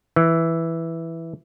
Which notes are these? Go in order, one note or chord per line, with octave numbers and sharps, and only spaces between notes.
E3